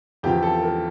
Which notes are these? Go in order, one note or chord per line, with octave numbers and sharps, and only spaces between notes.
E2 C#3 F3 G4
A4
A#4